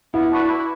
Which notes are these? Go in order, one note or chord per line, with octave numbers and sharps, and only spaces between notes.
B3 E4
D4 F#4 B4
E4